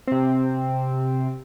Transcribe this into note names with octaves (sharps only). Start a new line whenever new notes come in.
C3 C4